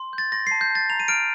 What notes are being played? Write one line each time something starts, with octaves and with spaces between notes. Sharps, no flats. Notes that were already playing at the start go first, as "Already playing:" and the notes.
Already playing: C6
G6
A6
C6 A#6
A5 C7
G6
A5
A6
A#5 F7
D#7
F6 D7